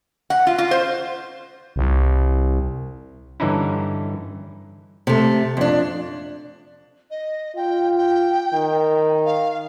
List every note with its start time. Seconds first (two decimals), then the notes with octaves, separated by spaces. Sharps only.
0.30 F#5
0.47 F4
0.58 F4
0.71 C5
1.76 C2
3.40 G2 D3 E3 C#4 D#4 E4
5.07 C3 A3
5.57 F2 D4
7.10 D#5
7.56 F4 G5
7.97 G5
8.54 D#3
9.25 F5